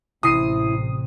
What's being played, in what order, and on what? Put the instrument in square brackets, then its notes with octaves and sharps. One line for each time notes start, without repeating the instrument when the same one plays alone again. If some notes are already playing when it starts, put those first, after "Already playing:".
[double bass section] A1 [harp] C3 [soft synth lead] E4 [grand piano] D#6 C7 D#7